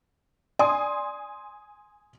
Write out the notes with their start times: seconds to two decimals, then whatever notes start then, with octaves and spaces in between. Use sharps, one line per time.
0.59 D5 G#5 C6 D#6